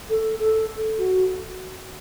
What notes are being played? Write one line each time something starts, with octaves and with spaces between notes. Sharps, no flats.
A4
A4
F#4